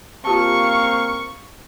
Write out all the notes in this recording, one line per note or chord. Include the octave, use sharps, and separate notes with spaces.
A#3 C4 F4 G4 F5 A5 C#6